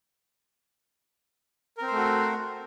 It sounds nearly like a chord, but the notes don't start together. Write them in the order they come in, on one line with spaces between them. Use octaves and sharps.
A#4 C4 C5 A3 F#4